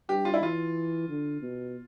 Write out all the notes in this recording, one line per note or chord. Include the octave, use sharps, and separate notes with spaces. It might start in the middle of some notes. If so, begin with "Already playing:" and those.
G2 G4
F4
E4
E3 F4
D3
B2